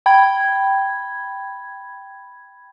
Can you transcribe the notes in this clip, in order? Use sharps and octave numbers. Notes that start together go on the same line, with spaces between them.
G5 B5 G#6